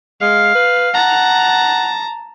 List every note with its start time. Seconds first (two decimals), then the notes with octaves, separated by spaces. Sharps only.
0.21 G#3 F5
0.55 B4
0.94 F#5 A5 A#5